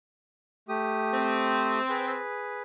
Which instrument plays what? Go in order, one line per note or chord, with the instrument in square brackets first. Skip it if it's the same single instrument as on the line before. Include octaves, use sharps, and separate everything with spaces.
[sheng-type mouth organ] A3 G4 D#6
[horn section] C4
[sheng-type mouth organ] G#4 B4